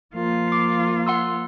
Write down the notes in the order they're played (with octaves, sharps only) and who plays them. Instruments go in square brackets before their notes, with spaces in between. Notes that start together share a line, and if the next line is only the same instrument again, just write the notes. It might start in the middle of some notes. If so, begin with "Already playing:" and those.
[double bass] F3 A#3 [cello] F4
[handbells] D6 C7
F#5 C6 E6